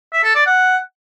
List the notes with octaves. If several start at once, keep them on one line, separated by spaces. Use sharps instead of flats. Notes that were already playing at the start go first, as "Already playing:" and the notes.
E5
A4
D5
F#5